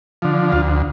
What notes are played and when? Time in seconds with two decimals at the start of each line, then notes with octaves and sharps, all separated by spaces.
0.22 D3 F3
0.52 D2 F4